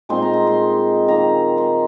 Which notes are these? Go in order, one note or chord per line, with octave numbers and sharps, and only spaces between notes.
A#2 G#3 C4 D#4 C6
A#5
A#5
C6
D#3 A#3 D#4 A#5
C6